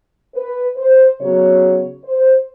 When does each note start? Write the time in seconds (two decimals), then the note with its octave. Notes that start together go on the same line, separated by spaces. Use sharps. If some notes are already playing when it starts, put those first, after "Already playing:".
0.35 B4
0.77 C5
1.20 C#3 F#3 B3 C#5
2.05 C5